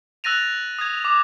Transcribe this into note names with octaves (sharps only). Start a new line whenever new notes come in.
E6 F#6 A6 A#6 D#7 F7
D#6 G#6
D6